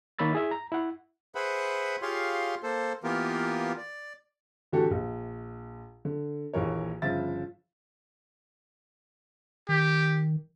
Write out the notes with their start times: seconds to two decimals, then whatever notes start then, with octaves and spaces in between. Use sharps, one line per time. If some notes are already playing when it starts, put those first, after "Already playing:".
0.19 D#3 A#3 C#5 B5 E6 A6
0.33 E4 G#4 E5
0.51 A#5
0.72 E4 F#5
1.35 G#4 B4 C5 E5 F#5 B5
2.02 F4 G4 G#4 C#5 F5 C6
2.63 A#3 A4 C5
3.04 E3 A#3 B3 F4 G4 A#4
3.77 D5
4.73 A2 D3 E3 F#4 G4 A4
4.91 A#1
6.05 D3
6.53 A#1 D#2 E3 A#4 C#5
7.02 G1 C#3 F3 E5 A6
9.69 D#3 G4